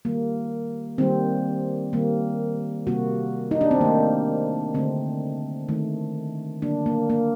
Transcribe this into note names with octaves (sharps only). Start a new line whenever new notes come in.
D#3 G3 A#3
D#3 G3 A#3 C4
D#3 G3 A#3
C3 G3 A#3 F#4
D#4
D4
C4
D#3 A3 A#3
D3 A3 C4
D#3 A3
D3 F#3 A#3 D4
A#3
A#3